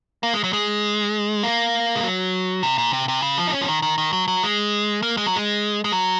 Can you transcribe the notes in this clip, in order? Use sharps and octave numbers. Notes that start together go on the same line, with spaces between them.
A#3
G#3
F#3
G#3
A#3
G#3
F#3
C3
A#2
C3
C3
C#3
F3
D#4
C#4
F3
D#3
D#3
D#3
F#3
F#3
G#3
A#3
G#3
F#3
G#3
G#3
F#3